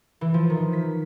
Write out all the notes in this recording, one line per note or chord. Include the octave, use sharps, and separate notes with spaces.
E3
F3
D#3
B6